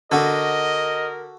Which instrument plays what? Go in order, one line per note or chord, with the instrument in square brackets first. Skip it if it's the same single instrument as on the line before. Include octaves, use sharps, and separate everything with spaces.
[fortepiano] D3 [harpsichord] F#4 A4 [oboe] A#4 [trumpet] D#5